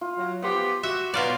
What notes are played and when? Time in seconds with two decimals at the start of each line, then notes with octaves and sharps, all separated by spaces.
0.01 F4
0.18 F#3
0.42 F3 B3 G4 F#5 C6 D6
0.83 F#4 E5
1.14 B2 D#4 F4 F#4 C#5 D5